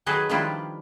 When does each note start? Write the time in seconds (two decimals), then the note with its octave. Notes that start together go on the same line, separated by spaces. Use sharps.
0.06 D#3 F#3 G#4 A4 B4 D#5
0.29 D#3 F3 G3 D4 E4 F4